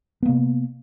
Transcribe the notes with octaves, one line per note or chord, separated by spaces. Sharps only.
C3 A#3 B3